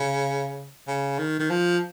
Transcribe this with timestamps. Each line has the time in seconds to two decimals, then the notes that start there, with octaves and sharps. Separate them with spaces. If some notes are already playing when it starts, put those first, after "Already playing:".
Already playing: C#3
0.88 C#3
1.19 D#3
1.39 D#3
1.50 F3